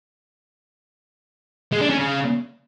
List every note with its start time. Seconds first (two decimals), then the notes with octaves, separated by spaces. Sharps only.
1.72 G#3
1.81 D4
1.90 C#4
1.98 C#3